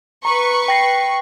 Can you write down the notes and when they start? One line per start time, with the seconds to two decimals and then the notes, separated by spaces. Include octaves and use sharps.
0.25 B4 A#5 C#6
0.68 G5 A#6 C7